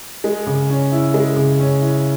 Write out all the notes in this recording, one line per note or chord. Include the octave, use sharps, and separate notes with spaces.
G#3
C#3
C#4
E4
G#3
C#3
C#4
E4